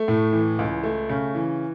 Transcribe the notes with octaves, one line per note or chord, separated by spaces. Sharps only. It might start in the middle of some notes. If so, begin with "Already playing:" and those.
Already playing: A3
A2
E3
C#2
A3
C#3
E3